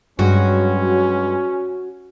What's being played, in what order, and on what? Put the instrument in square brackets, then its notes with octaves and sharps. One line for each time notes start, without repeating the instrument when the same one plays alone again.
[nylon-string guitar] G2 G#3 [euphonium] F#3 [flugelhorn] C#4 [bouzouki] F#4